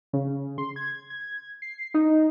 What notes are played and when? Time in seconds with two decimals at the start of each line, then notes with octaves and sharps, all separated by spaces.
0.13 C#3
0.58 C6
0.76 G#6
1.10 G#6
1.62 C7
1.94 D#4